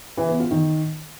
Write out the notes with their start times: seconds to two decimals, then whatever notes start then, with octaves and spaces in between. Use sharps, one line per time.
0.17 E3
0.29 B3
0.40 F4
0.51 D#3